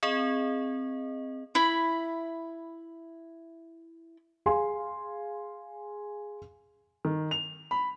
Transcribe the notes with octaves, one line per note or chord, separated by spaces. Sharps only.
C4 G#4 D#5
E4 B5
G#4 F5 G#5 C6
D#3
F7
B5